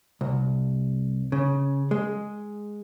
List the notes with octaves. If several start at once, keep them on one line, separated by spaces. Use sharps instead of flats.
C2
C#3
G#3